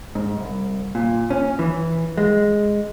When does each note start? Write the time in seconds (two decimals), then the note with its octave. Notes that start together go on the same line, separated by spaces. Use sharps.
0.15 G#2
0.39 C2
0.95 A#2
1.30 C#4
1.59 E3
2.18 G#3